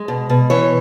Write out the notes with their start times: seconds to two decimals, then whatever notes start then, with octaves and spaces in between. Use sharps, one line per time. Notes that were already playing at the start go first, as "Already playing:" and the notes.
Already playing: G#3
0.08 B2
0.30 B2
0.50 E3 C#5